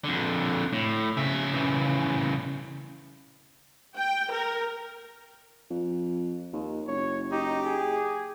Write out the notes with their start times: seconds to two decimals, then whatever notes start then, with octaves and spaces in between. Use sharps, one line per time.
0.04 F2 D3
0.73 A2
1.17 C#3 E5
1.54 C#3 E3
3.95 G5
4.30 A#4
5.70 F2
6.53 D#2
6.87 F#1 C#5
7.31 D#4 G4
7.65 G#4